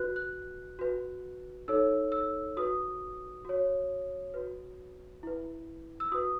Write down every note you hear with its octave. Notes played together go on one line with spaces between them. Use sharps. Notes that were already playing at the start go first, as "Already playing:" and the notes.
Already playing: F#4 B4 F#6
F#6
F#4 B4
D#4 A4 C#5 E6
E6
F#4 B4 D#6
F#4 C#5
F#4 B4
E4 B4
E6
F#4 B4 D#6